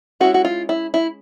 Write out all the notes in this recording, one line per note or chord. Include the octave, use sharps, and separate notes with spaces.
G#3 C#4 E4 F#4
F#4
F4
E4
E4